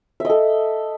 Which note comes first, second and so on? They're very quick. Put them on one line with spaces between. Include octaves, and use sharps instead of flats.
E5 D#5 A4